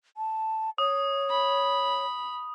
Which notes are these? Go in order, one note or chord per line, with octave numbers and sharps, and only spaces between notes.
A5
C#5 D#6
B5